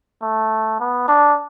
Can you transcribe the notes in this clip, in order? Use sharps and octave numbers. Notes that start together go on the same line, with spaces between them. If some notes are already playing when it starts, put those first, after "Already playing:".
A3
B3
D4